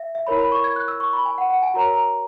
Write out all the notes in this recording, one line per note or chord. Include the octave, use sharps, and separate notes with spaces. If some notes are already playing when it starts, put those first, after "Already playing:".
Already playing: E5
E5
E4 A#4 C#5 B5
B5
C#6
G#6
F#6
E6
C#6
B5
G#5
F#5
F#5
G#5
F#4 A#4 C#5 A#5
A#5